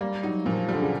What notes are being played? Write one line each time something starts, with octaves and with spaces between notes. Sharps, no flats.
G3 A#3
F#3 D#4
A#2 F3
D3 G3
C#3